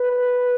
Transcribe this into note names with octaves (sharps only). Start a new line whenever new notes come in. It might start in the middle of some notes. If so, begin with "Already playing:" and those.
Already playing: B4